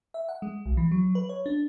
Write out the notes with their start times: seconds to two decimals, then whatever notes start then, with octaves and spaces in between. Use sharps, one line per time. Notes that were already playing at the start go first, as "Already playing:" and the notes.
0.14 E5
0.29 F#5
0.42 G#3
0.66 B1
0.77 E3
0.91 F#3
1.15 B4
1.29 C#5
1.46 D4